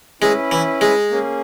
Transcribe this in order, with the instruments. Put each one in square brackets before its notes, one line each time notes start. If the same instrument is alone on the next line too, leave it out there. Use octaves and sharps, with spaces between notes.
[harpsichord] G#3 [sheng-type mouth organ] C#4 E4 B4
[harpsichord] E3
G#3
[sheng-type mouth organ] A#3 C#4 G#4